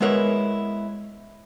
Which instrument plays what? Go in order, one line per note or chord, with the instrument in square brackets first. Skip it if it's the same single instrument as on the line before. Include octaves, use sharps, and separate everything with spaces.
[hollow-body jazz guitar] G#3 B3 E4 A#4 B4 C#5